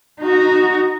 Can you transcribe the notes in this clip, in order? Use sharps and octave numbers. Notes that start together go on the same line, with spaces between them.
D#4 F#4